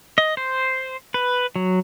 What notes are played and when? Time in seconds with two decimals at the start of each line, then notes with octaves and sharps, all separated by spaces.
0.18 D#5
0.37 C5
1.14 B4
1.56 F#3